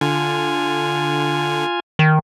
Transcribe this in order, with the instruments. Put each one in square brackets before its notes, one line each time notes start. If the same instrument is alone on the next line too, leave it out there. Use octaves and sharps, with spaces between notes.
[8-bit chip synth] D3 [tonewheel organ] F4 G#5
[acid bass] D#3